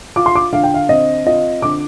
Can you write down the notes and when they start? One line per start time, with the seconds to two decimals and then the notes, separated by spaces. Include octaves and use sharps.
0.16 F4 D6
0.26 C6
0.35 D6
0.52 D3 F5
0.63 G5
0.74 F5
0.89 C4 D#5
1.26 F4 D#5
1.62 D3 D6